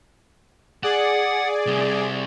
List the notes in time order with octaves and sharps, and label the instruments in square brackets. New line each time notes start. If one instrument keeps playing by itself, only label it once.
[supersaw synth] G#4 D5 [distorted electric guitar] F#5
[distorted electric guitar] C2